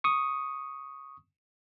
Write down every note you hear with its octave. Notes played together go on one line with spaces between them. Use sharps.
C#6 D#6